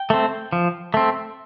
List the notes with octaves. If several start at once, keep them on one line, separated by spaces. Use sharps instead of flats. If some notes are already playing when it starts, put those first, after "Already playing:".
Already playing: G5
A3 C4
F3
A3 C4